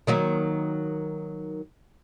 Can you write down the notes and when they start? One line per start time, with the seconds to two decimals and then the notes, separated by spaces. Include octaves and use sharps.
0.07 D#3 F#3 A#3